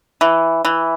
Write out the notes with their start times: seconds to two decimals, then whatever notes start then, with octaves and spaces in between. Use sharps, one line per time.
0.21 E3
0.65 E3